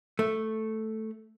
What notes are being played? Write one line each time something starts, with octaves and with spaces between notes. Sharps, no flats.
A3